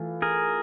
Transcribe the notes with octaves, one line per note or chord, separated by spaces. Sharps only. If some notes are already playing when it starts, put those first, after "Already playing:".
Already playing: E3 A3 F4
G#4 A#4